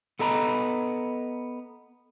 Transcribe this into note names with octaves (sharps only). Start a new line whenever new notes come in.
B3 A4 D#5 A#5 B5